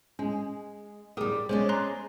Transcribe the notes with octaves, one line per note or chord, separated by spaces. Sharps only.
G#3 C#4
G3 G4 G#4 A#4 D#6
G#3 C#4 C5 D5
A#5 C6 F#6